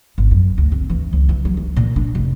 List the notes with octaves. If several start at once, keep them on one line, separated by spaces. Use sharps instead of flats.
G#1
F#2
D2
C4
E3
C#2
E3
F#3
E3
A#2
D4
F1